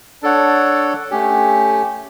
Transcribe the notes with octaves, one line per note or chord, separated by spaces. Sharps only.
D4 A4 C#5 F#5
A3 C#4 G4